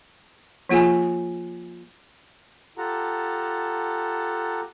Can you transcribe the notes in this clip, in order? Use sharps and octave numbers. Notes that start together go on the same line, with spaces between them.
F3 A#3 F4 G#4 G#5
F4 G4 A4 F#5 A5 A#5